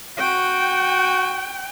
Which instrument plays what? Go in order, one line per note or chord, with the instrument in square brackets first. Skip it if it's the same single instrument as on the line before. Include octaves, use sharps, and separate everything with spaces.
[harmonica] F#4 [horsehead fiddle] G5